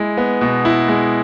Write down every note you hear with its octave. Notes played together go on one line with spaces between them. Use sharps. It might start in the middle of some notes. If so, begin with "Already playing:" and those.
Already playing: G#3 E4
B3
B2
E4
G#3